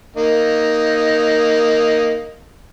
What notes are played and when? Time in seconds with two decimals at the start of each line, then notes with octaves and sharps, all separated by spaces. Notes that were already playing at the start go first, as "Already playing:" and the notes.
0.16 A#3 D#4